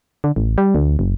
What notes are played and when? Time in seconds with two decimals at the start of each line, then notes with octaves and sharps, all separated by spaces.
0.24 D3
0.36 A1
0.58 G3
0.75 D2
0.99 F#1